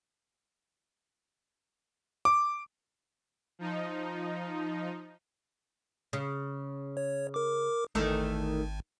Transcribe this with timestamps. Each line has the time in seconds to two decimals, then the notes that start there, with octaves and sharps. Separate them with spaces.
2.25 D6
3.59 F3 D#4
6.13 C#3
6.97 C#5
7.34 A#4 D6
7.95 G#1 E2 D#3 A3